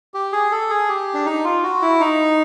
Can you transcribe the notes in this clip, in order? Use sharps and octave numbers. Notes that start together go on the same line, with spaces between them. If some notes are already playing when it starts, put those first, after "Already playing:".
G4
G#4
A4
G#4
G4
D4
D#4
F4
F#4
E4
D#4